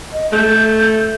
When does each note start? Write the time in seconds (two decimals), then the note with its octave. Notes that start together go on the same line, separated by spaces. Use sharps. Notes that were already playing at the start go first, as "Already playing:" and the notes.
0.13 D#5
0.32 A3 G6